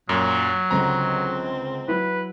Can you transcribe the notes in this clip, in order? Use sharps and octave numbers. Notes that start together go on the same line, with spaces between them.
F#2 A#2 F#3 D#6 F6 G6
C#2 D3 C4 A#5
F#3 E4 B4